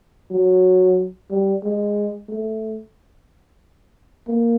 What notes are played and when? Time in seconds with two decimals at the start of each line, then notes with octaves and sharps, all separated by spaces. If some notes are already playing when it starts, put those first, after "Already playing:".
0.31 F#3
1.30 G3
1.64 G#3
2.29 A3
4.28 A#3